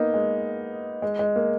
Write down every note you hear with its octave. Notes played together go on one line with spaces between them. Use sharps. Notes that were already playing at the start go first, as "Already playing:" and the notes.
Already playing: A#3 B3 D#4
G#3
G#3
G#3
A#3